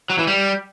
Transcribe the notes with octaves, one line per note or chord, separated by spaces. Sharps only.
F#3
E3
G3